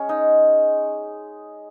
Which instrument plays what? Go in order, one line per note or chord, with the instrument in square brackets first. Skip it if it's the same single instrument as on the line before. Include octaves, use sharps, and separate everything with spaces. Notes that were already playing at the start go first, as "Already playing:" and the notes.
Already playing: [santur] G#3 C#4
D#4